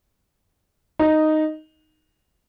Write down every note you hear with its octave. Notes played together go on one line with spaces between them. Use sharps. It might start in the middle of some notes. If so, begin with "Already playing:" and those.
D#4